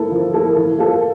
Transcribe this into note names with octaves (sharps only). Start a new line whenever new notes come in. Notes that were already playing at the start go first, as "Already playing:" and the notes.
Already playing: A#3 E4 A4
F3
A#3 E4 A4
E3
A#3 F4 A4